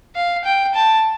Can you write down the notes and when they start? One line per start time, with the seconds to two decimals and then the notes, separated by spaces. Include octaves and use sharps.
0.15 F5
0.45 G5
0.75 A5